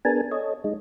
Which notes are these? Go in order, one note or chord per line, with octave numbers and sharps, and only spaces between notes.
B3 D4 G#4 A#4 G#5 A5
A4 C#5 D#5
G#3 D#4